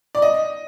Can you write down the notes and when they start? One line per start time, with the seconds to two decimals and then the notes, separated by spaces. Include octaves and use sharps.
0.15 D5
0.22 D#5